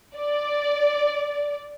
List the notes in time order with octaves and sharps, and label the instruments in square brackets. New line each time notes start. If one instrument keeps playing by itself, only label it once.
[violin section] D5